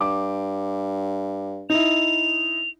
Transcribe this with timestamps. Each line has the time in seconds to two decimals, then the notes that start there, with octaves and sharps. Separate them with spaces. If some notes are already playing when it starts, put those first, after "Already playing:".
0.01 G2 D6
1.70 D#4 E4 F7